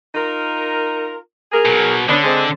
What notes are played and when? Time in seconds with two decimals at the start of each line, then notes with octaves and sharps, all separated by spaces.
0.15 D#4 F4 A#4
1.52 G#4 A#4
1.66 B2 F#3
2.09 D3 B3 C#4 D4
2.24 G#3 C4